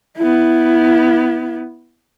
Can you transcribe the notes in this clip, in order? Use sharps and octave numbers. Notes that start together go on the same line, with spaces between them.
B3 E4